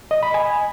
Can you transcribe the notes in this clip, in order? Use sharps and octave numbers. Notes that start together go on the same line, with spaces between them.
D#5
B5
G#5